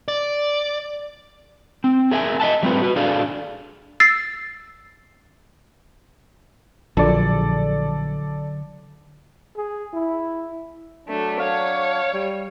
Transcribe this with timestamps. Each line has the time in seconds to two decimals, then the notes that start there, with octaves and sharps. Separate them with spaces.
0.08 D5
1.84 C4
2.11 G#4 A#4 E5 G5 G#5
2.40 D#5 E5 F#5 A5
2.63 F#3 G3 A3 C4 F4 B4
2.82 F#4 B4
2.96 D4 F#4 G#4 A4 D5 F5
4.00 E6 A6 C7
6.97 A#1 D3 F#3 A4 D5
9.57 G#4
9.94 E4
11.07 F#3 A3 D4
11.40 C#5 F5
12.13 G3